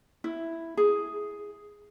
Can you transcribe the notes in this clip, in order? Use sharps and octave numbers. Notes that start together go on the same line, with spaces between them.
E4
G#4